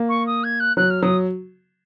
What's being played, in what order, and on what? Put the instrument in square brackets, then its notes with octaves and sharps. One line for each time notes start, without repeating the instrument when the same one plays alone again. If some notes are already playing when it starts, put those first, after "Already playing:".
Already playing: [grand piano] A#3
[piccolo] C#6
D#6
G#6
F#6
[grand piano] F#3 [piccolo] F#6
[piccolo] F6
[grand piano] F#3 [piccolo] D#6